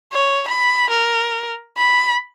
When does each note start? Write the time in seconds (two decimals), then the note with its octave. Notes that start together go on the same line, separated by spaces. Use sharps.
0.12 C#5
0.48 B5
0.90 A#4
1.77 B5